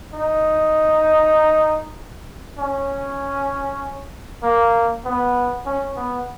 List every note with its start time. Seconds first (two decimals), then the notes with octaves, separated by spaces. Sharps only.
0.13 D#4
2.59 C#4
4.43 A#3
5.05 B3
5.66 C#4
5.97 B3